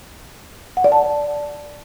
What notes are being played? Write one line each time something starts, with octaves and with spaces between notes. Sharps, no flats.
F#5
D5
A5